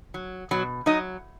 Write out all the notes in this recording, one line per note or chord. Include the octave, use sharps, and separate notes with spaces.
F#3
B2 F#3 F#4
F#3 D#4 D#5